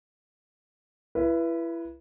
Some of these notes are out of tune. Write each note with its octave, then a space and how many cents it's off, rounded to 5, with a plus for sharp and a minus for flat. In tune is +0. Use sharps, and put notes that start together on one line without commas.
E4 +25 B4 -20